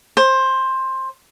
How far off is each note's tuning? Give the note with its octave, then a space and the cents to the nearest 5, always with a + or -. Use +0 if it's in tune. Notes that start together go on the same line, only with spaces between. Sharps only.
C5 +15